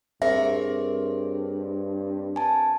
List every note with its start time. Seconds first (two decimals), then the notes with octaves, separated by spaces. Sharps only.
0.22 G2 C4 G#4 A#4 C#5 E5
2.36 G#5 A5